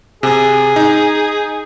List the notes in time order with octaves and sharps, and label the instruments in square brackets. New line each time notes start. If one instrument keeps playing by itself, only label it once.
[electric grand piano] C3 [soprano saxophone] G#4
[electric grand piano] D#4